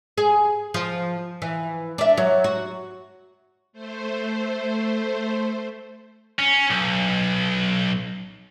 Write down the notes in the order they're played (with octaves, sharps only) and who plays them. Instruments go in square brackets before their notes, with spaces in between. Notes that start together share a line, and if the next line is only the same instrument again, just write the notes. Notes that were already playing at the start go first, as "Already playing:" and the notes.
[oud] G#4
F3
E3
D4 E5
F#3
F#4
[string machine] A3 C5
[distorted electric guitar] C#4
B1